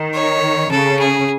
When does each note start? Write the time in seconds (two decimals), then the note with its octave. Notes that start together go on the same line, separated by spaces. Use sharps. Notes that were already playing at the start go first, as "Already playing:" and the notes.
Already playing: D#3
0.14 C#5
0.71 C#3 A4
0.99 G#4